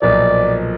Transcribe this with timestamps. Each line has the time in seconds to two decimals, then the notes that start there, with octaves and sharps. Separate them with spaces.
0.02 B1 A#2 F3 D5